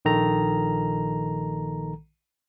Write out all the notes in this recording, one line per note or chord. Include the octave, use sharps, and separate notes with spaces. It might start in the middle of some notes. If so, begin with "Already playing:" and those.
A#1 D#3 A4 A#5